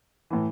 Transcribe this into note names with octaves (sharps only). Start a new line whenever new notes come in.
A2 E3